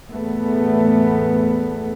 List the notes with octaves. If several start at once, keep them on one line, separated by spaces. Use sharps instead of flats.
E2 A2 A3 B3